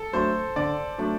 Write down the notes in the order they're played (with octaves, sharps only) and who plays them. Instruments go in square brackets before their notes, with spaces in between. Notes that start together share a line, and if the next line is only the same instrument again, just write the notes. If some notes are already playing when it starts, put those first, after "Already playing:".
Already playing: [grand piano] A4
[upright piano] F#3 A3 D4 [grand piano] C5
[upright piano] D3 [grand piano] D5
[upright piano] F#3 A3 D4